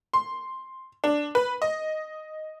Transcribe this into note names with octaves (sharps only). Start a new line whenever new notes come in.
C6
D4
B4
D#5